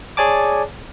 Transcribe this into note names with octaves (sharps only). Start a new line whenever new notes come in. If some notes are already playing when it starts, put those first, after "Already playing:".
G#4 C#5 D5 G#5 A5 D6